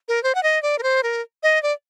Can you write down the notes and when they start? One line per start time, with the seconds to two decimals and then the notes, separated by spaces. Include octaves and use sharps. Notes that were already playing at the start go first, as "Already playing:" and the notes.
0.08 A#4
0.23 C5
0.35 F#5
0.43 D#5
0.63 D5
0.79 A#4
0.83 C5
1.03 A#4
1.43 D#5
1.63 D5